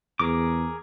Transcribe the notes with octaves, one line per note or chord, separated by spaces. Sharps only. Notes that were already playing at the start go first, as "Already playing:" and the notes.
E2 G#4 A#4 D6